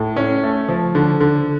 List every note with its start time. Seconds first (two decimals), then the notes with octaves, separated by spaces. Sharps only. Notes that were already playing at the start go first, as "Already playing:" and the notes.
Already playing: A2
0.16 C#4
0.43 A3
0.68 F3
0.95 D3
1.20 D3